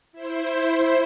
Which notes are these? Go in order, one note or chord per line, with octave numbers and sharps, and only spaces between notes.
E4 C5